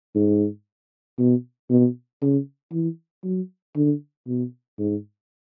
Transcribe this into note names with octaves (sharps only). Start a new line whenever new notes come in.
G#2
B2
B2
C#3
E3
F#3
D3
B2
G#2